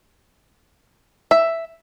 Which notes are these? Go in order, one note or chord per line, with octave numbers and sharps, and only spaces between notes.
E5